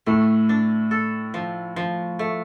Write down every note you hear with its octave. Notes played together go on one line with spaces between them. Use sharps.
A2 A3
D4
A4
F3
F3
A3